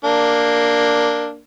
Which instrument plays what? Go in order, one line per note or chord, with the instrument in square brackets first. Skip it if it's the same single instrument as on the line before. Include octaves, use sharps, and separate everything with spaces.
[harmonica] A#3 D4